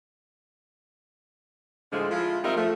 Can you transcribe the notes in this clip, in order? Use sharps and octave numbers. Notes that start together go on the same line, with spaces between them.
A2 D3 F3 G#3
F3 G#3 E4 F4
G3 C4 D#4 F4 A#4 E5
F3 A3